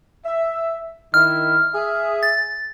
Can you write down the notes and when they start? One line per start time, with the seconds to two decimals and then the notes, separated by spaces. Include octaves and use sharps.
0.25 E5
1.14 D#3 E4 F6
1.74 G#4 E5
2.23 A6